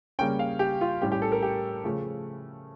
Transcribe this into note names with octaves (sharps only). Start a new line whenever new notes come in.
C#3 G3 A#3 C#4 G5
F5
G4
F4
A2 G3 C#4 G4
G4
A4
A#4
G4
C#3 F3 A3